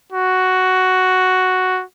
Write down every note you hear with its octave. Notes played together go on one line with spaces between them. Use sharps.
F#4